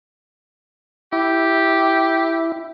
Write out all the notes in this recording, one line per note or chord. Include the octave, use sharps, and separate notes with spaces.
E4 G4